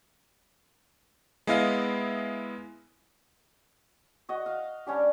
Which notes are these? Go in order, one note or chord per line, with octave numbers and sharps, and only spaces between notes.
G#3 B3 E4 D#5 F5
F#4 D#5
F5
G3 C#4 D4 G4